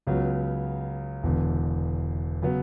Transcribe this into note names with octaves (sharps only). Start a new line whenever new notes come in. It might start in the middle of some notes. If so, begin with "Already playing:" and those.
C#2 C#3 F#3 B3
E1 E2 D3
C#3 F#3 B3